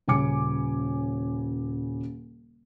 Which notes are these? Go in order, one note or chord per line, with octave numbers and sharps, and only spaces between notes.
D#1 C#3 C#4 G#5 D6 C#7